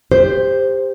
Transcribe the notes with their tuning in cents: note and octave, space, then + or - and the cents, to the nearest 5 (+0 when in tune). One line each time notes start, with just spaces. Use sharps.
G4 +20 C5 +0